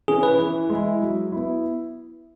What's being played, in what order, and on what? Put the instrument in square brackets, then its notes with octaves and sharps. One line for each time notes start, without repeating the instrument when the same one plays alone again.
[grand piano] E3 C#4 [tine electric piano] G#4
[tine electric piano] B4
[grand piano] E3
G#3 E4
F#3
B3 E4